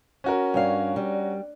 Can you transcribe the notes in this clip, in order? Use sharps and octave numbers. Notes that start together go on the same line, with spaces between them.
C#4 F#4 A#4
G2 C#5 F5
G3